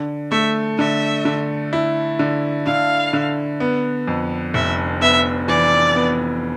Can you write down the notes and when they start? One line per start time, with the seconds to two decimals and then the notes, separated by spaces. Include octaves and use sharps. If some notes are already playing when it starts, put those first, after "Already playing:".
Already playing: D3
0.32 A3 E5
0.79 D3 E5
1.25 D3
1.73 E4
2.19 D3
2.66 D3 F5
3.13 D3
3.60 B3
4.08 F2
4.54 F1 E5
5.01 B3 E5
5.48 E3 D5
5.95 B3